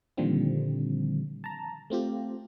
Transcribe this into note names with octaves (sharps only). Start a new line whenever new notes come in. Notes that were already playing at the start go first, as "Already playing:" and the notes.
A#2 D3 D#3 F3 G3 C4
A5 A#5
A3 C4 F4 G4